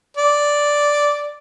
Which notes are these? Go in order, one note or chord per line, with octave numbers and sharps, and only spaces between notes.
D5